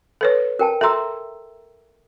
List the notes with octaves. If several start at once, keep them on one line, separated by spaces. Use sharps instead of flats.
A4 B4 C#5
A#4 G5 A5
A4 E5 A#5 C6 E6